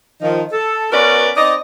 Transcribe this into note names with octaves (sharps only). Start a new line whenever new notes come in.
D#3 F3 D#4
A4
B3 C#4 F#4 A#4 B4 D5
C4 D#4 D5 D#5